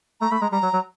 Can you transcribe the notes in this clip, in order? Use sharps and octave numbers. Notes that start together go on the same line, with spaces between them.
A3 A#5
A3 B5
G#3 A#5
G3 A#5
F#3
F#3